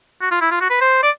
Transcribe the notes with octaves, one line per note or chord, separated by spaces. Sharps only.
F#4
F4
E4
F4
F#4
B4
C5
D5